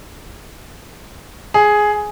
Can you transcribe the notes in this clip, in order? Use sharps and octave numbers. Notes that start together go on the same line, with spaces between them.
G#4